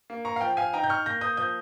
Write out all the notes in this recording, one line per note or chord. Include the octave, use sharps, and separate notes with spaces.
A#3
A#5 C#6
F5
F3 G5
F5 G#5
D#4 G5 A#5
G6
C#6 F6
A#3 G6 A#6
D#6 G6
F3 D#6 G6